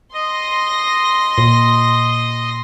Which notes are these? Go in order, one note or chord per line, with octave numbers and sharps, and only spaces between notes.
D#5 C6 A#6
A#2